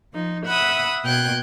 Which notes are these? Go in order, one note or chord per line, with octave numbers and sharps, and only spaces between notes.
F3 D#4
E5 F#5 B5 D#6
B2 G5 F#6 G#6